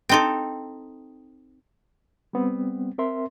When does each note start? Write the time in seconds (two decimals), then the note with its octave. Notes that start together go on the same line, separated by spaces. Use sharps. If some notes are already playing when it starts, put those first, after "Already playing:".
0.09 C4 D#4 A4 G5 C6
2.33 G3 B3 C4
2.98 C4 A#4 E5 C6